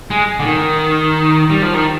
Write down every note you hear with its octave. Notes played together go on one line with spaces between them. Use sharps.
G#3
D3
D#3
G3
F3
D#3